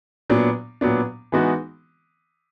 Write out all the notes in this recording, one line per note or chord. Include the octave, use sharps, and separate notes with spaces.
A#2 F#3 B3 D4
A#2 F#3 B3 D4
E3 G#3 B3 D#4 F#4